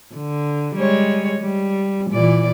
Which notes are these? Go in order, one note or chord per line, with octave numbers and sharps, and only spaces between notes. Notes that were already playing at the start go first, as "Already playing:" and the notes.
D3
G3 G#3 C#5
G3
A#2 E3 D5